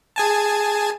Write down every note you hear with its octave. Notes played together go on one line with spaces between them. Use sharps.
G#4 G#5 A5